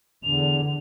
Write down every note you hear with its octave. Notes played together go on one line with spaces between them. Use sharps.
E2 D3 F7